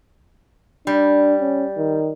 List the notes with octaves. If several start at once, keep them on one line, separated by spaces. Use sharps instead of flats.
G3 D4
C#4
D#3